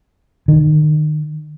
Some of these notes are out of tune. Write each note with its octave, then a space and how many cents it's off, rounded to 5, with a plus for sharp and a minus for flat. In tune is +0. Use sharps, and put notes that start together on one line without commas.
D#3 -30